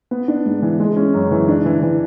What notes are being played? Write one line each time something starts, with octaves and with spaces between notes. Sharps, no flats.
B3
D4
G#2
E3
G#3
C#4
F#2
E3
D4
E3
E3